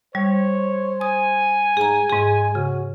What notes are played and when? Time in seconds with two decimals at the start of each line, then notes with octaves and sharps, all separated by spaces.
0.15 G3 C5 C#5
1.01 G#5 D#6
1.77 G#2 G#4 A#5
2.10 G#2 G#3 G#4
2.55 C#3 F#4